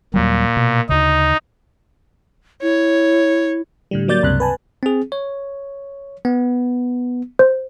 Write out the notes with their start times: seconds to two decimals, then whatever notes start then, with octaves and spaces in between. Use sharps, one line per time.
0.14 D#2 A#2 F#3 G3
0.57 B2
0.89 D2 C#3 D#4
2.62 E4 C#5
3.91 A2 D3 G3
4.08 F#3 A#3 D5 G6 A6
4.23 C#2 G2 C3 F#6
4.40 B4 G#5 A5
4.83 C4 G#4
5.12 C#5
6.25 B3
7.39 C5